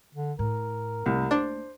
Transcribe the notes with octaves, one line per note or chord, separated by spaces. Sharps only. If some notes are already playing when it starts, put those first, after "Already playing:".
D3
A2 A#4
C2 A3 A#3
D4 C5